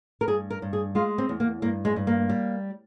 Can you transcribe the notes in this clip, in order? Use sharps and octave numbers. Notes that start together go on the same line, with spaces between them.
A#4
G2 G#4
A#4
G2
G#4
G#3 F4
C4
E2
A#3
G2 A#3
G#3
G2
A#3
G3